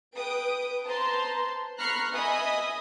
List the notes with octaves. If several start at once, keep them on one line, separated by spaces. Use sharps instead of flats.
B4 G5 D#6 D7
B4 C5 A5 A#5 C6
A#5 B5 C#6 F6 F#6 C7
D#5 E5 G#5 B5 D#6